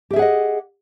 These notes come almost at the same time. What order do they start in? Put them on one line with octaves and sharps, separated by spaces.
G4 E5 G#4 F#5 D#5